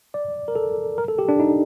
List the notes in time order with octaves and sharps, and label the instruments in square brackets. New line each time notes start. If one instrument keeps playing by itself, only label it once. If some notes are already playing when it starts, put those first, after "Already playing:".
[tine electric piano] D5
A#4
A4
A#4
A4
G4
D4
D#4